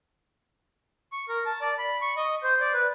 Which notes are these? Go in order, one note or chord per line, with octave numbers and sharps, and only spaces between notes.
C#6
A#4
A5
D5
B5
C#6
D#5
C5
D5
B4